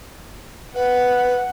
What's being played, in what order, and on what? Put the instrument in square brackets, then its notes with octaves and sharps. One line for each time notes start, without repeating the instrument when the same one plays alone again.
[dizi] B4 [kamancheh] F#5